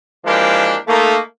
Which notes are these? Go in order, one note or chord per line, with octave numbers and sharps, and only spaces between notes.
E3 F3 G#3 A#3 D4 G4
A3 A#3 D#4